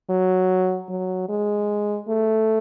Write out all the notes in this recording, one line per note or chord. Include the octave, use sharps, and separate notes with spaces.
F#3
F#3
G#3
A3